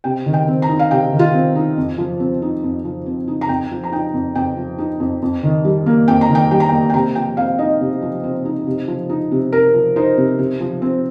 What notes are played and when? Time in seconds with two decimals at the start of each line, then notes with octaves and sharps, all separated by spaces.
0.04 C3 G5
0.26 D#3
0.34 G5
0.48 C4
0.62 A#5
0.69 D#4
0.79 F5
0.91 C3 G5
1.12 D#3
1.19 F4
1.34 C4
1.55 D#4
1.77 F2
1.98 F3
2.20 C4
2.42 D#4
2.63 F2
2.85 F3
3.06 C4
3.28 D#4
3.41 A#5
3.49 F2 G5
3.71 F3
3.84 A#5
3.92 D#4 G5
4.14 F2
4.35 F2 G5
4.57 F3
4.78 D#4
5.00 F2
5.22 F2
5.43 D#3
5.65 G3
5.86 A#3
6.08 F2 G5
6.21 A#5
6.29 D#3
6.35 G5
6.51 G3 G5
6.60 A#5
6.69 G5
6.72 A#3
6.90 G5
6.94 C3 A#5
7.15 F3 G5
7.37 C4 F5
7.58 D#4 D#5
7.81 C3
8.02 F3
8.24 C4
8.45 D#4
8.67 C3
8.88 F3
9.09 D#4
9.31 C3
9.52 C3 A#4
9.74 F3
9.96 D#4 C5
10.17 C3
10.39 C3
10.60 F3
10.82 C4